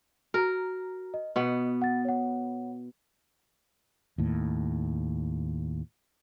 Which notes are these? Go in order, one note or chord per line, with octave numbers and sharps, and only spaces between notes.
F#4 A#4 A#5
D#5
B2 B3 D#5
F#5 A6
C#5 F#5
D#2 A2